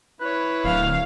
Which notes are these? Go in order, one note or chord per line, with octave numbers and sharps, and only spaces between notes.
E4 B4 C#5
D1 F5